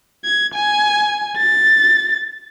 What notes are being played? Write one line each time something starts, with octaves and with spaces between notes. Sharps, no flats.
G#6
G#5
A6